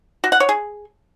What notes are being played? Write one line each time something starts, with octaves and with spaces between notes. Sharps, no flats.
F#4
F#5
C#5
G#4